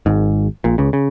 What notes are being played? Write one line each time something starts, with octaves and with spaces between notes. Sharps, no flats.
G#1 G#2
A#1 A#2
C#2 C#3
C#3